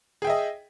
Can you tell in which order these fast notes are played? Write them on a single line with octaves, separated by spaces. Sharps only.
G#4 G5 E5 D#5